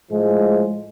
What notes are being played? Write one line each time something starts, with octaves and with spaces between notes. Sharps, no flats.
A2 F3 G#3